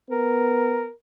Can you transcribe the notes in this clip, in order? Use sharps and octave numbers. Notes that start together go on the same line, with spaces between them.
B3 A#4